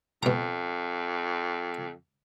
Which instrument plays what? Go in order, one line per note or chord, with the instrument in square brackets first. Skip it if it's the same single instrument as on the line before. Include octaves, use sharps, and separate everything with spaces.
[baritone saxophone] F2 [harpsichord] B2 A#5